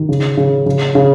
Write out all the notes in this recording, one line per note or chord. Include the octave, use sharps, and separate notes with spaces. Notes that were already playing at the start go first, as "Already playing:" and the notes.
Already playing: D#3
C#3
C#3
C#3
C#3